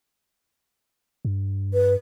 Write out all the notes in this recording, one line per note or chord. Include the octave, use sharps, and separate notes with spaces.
G2
B4